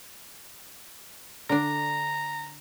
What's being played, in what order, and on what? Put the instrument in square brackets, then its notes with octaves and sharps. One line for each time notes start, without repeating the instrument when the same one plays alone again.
[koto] D3 D4 [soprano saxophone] A#5